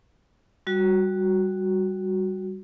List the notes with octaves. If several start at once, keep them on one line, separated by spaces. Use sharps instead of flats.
G3 F#4